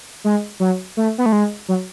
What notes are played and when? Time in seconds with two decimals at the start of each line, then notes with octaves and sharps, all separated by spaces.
0.24 G#3
0.60 F#3
0.97 A3
1.18 B3
1.26 A3
1.32 G#3
1.69 F#3